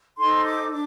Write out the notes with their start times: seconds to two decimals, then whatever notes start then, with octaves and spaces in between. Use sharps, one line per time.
0.17 D#4 A4 C5 C6
0.44 D6
0.71 D4 D6